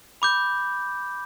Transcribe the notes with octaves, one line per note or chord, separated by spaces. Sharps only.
B5 D6 G6